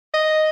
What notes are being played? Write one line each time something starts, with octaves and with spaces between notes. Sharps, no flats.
D#5